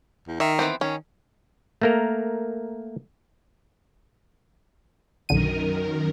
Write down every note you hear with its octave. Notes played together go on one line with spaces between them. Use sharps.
E2
D#3 E5
E3 B3 C4
D#3 C#4
A3 A#3 A#4
B1 F#2 D3 D#3 A#4 D#7